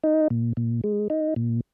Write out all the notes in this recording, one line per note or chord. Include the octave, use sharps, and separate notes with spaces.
D#4
A#2
A#2
G#3
D#4
A#2